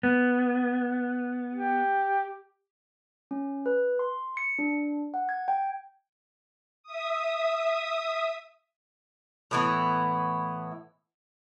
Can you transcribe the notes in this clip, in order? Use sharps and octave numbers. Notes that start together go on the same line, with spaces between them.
B3
G4
C#4
B4
C6
C#7
D4
F#5
G#6
G5
E5 D#6
A2 E3 B3